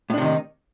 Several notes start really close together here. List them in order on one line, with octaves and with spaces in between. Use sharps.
A2 D4 C3 D#3 D#4